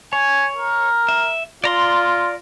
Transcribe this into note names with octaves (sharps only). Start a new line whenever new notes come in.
C#5 G#5
A#4
E5
F4 D5 A#5 C6